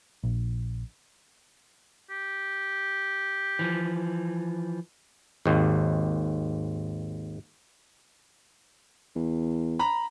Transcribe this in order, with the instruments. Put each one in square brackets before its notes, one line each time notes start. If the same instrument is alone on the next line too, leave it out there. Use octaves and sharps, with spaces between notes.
[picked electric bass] A#1
[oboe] G4
[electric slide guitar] E3 F3
[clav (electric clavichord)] G#1 D#2
[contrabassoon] E2
[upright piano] A#5 B5